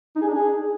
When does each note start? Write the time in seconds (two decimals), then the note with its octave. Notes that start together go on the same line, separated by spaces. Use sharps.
0.16 D#4
0.22 G#4
0.28 D4
0.34 G#4